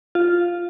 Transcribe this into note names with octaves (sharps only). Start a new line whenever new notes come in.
F4